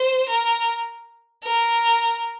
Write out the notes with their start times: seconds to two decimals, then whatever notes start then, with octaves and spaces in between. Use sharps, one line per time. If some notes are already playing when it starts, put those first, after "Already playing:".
Already playing: C5
0.29 A#4
1.44 A#4